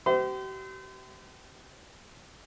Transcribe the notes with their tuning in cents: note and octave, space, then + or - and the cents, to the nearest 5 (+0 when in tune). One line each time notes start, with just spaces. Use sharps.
G4 -40 C5 -40 E5 -20